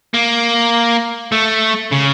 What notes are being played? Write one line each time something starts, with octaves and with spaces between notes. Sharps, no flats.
A#3
A3
C#3